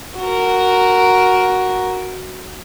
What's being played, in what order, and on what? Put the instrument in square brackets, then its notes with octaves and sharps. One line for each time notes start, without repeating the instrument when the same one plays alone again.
[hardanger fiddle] F#4 A#4